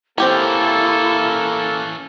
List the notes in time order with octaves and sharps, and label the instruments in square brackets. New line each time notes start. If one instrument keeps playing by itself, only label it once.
[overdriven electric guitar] E3 C#4 [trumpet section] A#3 A4 [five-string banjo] C4 G4 B5 [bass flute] E4